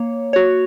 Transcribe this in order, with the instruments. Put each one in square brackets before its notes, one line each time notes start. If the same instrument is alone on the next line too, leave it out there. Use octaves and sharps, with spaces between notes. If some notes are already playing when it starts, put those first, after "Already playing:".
Already playing: [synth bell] A#3 C#5
F#4 C#5